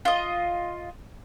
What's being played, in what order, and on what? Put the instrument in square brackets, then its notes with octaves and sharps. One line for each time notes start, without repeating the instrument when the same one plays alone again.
[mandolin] F4 D#5